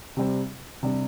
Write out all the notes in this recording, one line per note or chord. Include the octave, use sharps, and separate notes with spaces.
C3 G3 C4
C3 G3 D4